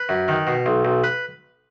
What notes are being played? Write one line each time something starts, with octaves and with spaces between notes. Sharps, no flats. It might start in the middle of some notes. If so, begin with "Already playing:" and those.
Already playing: B4
F#2
D#3
B2
B1
B1
B4